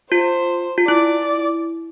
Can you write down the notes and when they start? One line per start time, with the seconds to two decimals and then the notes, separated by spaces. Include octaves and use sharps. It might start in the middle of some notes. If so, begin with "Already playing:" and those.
0.11 F4 C5
0.78 F4
0.88 E4 D5